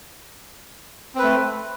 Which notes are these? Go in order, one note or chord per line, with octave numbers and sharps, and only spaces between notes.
A3 C4 B4